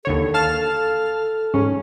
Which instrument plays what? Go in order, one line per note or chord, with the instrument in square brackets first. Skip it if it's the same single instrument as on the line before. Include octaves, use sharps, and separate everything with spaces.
[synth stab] D#2 D3 C#5 [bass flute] A4
[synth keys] F5 A5 F6
[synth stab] G#2 [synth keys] C#4